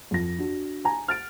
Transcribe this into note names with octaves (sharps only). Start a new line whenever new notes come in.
F2 A#6
D4 F#4
G#5 A#5
F6 A6 D7